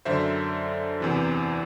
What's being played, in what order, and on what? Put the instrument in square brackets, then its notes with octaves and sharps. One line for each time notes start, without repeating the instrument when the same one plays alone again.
[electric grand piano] F#2 D3 C5 E5
E2 C3 E3